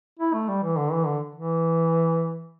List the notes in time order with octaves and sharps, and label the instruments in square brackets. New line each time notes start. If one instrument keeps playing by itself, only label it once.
[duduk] E4
A3
G3
E3
D3
E3
D3
E3